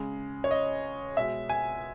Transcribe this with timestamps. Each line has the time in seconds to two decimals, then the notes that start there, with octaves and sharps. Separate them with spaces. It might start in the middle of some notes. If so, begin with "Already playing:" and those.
Already playing: C#3 G#3
0.44 C#5
0.51 D#5
1.17 B2 G#3 E5
1.49 G#5